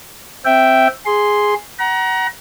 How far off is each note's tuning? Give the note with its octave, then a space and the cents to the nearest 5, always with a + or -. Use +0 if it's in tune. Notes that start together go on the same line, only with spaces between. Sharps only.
C4 +0 E5 +0 G5 -10
G#4 +0 C6 +0
F#5 +25 A#5 +30